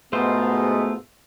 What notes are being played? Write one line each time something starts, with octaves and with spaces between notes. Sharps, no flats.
G#2 B2 A3 B3 F4 C5